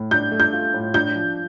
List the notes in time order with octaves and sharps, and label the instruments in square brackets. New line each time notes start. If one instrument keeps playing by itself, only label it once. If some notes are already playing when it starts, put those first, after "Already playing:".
Already playing: [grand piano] A2
[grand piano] D4 [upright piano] G6
[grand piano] A3
[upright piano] G6
[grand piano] F4
A2
[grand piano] D4 [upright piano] G6
[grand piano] F3